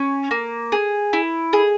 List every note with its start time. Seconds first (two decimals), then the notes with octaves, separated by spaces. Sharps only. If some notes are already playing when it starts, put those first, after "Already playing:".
Already playing: C#4 G#5
0.31 A#3
0.72 G#4
1.13 E4
1.53 G#4